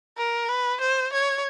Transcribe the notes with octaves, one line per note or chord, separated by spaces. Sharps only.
A#4
B4
C5
C#5